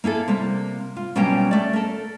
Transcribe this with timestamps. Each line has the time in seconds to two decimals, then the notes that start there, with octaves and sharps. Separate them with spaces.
0.04 A#3 E4 G#4 A4
0.28 C3 G3 A#3
0.97 F4
1.15 B2 F#3 G3 A#3 C#4 G5
1.51 A3 D5
1.73 A4 A#4